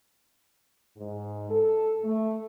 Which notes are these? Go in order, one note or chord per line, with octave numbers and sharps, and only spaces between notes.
G#2
A4
A3